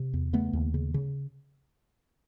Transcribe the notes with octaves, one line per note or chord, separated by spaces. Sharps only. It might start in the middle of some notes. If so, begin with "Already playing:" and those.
Already playing: C3
E2
C#3 A3 B3
D#2
C#3
C#3